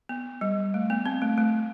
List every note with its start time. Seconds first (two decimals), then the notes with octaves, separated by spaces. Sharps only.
0.09 B3
0.41 G3
0.74 A3
0.90 B3
1.06 C4
1.22 A3
1.38 A3